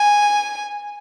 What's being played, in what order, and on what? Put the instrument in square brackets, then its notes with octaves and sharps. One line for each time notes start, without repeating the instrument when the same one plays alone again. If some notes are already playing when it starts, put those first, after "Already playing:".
Already playing: [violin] G#5